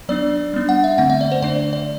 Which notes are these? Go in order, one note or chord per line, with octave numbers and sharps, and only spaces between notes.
F#3 B3 D4 D5
G3 B3 D4
F#5
E5
D3 A3 C4 F#5
E5
D5
C5
D3 A3 D4 D5
D5